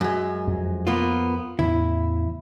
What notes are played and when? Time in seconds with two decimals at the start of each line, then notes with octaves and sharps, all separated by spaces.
0.01 F#2 G#3
0.48 F2
0.87 A#3 B3 F4
1.59 E2 A2 C#3 E4